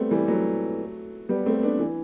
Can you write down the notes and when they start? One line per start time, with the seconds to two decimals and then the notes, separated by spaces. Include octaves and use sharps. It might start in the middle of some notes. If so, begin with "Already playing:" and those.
Already playing: G3 A3 B3 C4
0.11 E3 G3
0.27 F#3 A3
1.29 G3 B3
1.46 A3 C4
1.62 B3 D4
1.79 E3